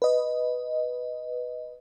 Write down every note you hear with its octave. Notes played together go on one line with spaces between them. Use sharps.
B4 D#5